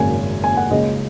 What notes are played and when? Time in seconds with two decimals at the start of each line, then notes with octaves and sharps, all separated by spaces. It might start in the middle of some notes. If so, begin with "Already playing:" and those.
Already playing: G#1 F#2 C#3 A#3 C#4 G#5
0.44 G#5
0.57 F#5
0.70 C#2 C#3 A#3 C#4 D#5